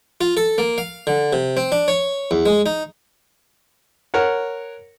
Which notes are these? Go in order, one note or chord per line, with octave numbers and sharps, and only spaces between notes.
F4
A4
A#3
F5
D3
C3
C4
D4
C#5
E2
G#3
D#4
A#4 C#5 F#5